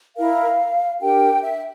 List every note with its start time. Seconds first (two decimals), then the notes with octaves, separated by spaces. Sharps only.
0.17 E4 A#4 F5
1.00 D4 G4 A#4 G5
1.42 E5